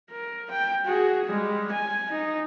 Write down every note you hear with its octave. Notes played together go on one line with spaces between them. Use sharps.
A#4
G5
F#4 G#4
G3 G#3
G#5
D#4